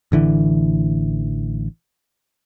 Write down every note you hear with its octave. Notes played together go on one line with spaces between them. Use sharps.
A1 D3 E3